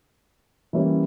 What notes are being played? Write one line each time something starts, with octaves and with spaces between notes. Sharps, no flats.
E3 G3 A#3 C#4 E4